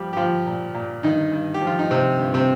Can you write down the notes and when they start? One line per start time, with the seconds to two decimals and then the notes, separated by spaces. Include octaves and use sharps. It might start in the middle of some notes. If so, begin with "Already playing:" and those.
Already playing: F3 G3 G4
0.13 G4
0.17 F3 F4
0.46 A#2
0.74 A#2
1.03 G2 D#3 D#4
1.32 G2
1.54 G4
1.61 F3
1.67 F4
1.79 D#4
1.90 C3 F3 C4
2.19 G2
2.34 C3 C4